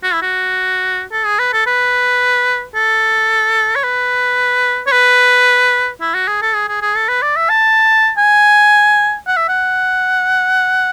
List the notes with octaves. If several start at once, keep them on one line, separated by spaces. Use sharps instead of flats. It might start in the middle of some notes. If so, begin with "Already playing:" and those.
F#4
E4
F#4
A4
G#4
B4
A4
B4
A4
C#5
B4
C#5
B4
E4
F#4
G#4
A4
G#4
G#4
G#4
A4
B4
D5
E5
A5
G#5
F#5
E5
F#5